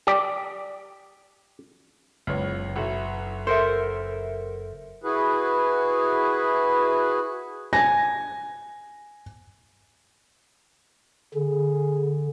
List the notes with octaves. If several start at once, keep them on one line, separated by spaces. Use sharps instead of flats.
G4 D5
F#1 C#2 B3 C#5
B1 E4 F#4
A4 A#4 C5 E5
E4 F#4 G#4 B4
G#5 A#6
D3 G#4